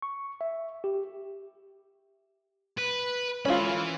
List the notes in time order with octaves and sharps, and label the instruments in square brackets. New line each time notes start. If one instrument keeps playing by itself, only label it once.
[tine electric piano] C#6
E5
G4
[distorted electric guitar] B4
[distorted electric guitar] E3 B5 [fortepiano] C#4 F4